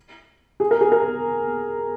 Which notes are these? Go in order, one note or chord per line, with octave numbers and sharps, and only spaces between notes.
G#4
A#4
G#4
A#4